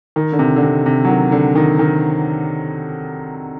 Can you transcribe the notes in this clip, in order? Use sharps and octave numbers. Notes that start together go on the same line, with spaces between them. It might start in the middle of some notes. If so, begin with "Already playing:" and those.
D#3
D3
C3
D3
C3
C3
F#3
D#3
D3
D#3
D#3